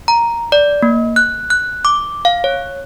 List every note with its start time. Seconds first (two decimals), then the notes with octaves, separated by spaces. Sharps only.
0.08 A#5
0.52 D5
0.82 A#3
1.16 F#6
1.50 F#6
1.85 D6
2.25 F5
2.44 C#5